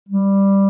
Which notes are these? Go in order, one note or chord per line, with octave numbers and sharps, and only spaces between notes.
G3